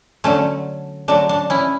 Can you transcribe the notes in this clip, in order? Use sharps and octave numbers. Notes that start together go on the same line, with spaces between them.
D3 F#3 A3 C#4
D3 F#3 A3 D4
D4
C#4 E4